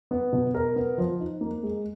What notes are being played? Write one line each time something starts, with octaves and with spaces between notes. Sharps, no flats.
B3
B2
A#4
B3
F3
D#4
A#3
G#3